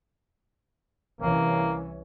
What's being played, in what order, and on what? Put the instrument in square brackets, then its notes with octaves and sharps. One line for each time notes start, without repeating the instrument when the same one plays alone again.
[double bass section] C2 E3 C#4 [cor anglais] A#3